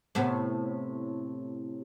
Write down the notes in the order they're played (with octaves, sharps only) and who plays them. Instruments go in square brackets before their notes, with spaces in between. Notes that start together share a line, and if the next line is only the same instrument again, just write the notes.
[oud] A2 C3 B3